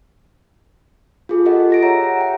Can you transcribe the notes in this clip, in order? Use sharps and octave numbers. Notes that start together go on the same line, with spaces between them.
F4 G#4 A4
F4 G4 A4 D#5 F#5
G4 A#6 D7
C#5 E5 F#5 A#5
F#5
G5